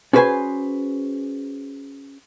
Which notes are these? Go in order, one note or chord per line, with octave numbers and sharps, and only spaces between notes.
C#4 F#4 G#4 B4 C5 G#5